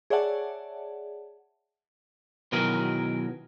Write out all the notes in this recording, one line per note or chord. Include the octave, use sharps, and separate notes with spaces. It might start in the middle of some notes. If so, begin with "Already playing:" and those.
G#4 C#5 D5 E5 F#5 A5
B2 D#3 E3 F#3 G#4 A#4